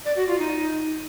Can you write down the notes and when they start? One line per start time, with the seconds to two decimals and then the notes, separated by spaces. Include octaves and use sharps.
0.05 D5
0.17 F#4
0.28 F4
0.39 D#4